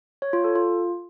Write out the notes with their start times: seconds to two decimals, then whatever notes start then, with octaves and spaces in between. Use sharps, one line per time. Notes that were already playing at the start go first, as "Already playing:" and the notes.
0.22 C#5
0.33 F4
0.44 A4
0.55 F4